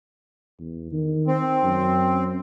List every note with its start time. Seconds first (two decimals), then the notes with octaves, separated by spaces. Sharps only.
0.60 E2
0.92 D#3
1.27 C4
1.63 F#2